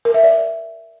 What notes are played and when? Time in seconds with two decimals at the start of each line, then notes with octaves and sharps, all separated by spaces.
0.05 A#4
0.14 E5
0.23 D5